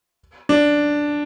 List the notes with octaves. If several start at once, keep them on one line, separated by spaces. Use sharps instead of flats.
D4